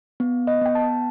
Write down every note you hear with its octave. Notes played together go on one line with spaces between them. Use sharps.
B3
D#5
B3 G5
A5